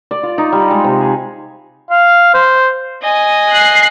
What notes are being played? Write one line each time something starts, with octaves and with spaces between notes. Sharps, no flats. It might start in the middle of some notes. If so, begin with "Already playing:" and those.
D5
F4
D#4
G3
G#3
C3
G#4
F5
C5
D#5 G#5
F#6 C7